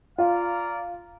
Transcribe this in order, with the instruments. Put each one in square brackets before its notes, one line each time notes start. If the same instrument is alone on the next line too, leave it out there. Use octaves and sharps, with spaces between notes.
[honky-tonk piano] F4 [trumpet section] D5 F5 A#5